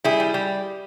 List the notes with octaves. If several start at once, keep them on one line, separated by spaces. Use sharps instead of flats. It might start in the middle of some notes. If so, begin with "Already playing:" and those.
G3 E4 G#4
G3
G3